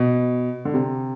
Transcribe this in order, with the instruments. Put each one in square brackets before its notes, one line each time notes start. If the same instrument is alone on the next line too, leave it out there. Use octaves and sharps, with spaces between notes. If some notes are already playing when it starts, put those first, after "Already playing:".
Already playing: [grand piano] B2
D3
C3